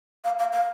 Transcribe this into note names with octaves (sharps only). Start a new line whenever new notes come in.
F5
F5
F5